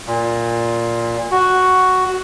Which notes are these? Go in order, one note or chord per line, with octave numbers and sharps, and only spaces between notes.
A#2
F#4